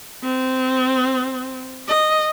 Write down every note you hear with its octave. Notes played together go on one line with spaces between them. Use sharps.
C4
D#5